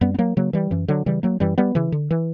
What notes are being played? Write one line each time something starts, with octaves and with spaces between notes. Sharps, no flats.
F#2 G3 B3
B3
F#3 A#3
C#3 F#3 A#3
E3 G3
F#2 E3
D3 F#3
C#3 E3 G3
F#3 A#3
F#2 E3 G3
G3 B3
C#3 E3
D3
E3